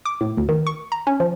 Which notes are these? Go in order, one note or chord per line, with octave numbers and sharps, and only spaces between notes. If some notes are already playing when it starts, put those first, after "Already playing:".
D6
A2
D2
D#3
C#6
A#5
C#4
F3